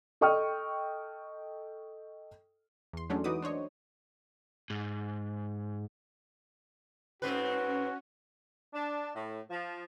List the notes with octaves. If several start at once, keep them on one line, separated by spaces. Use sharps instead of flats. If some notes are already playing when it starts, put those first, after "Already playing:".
A4 D#5 G5 C#6 D#6 F6
E2 C6
E3 F#3 G#3 A3 C#4 D4
E3 D#4 F#4 B4 D6 D#6
D4 C5 C#5 D#5
G#2
G#2 C4 C#4 F#4 B4
D4
A2
F3